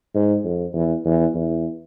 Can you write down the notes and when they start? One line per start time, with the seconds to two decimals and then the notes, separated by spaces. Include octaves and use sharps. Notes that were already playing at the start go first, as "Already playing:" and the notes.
0.14 G#2
0.44 F2
0.74 E2
1.05 E2
1.35 E2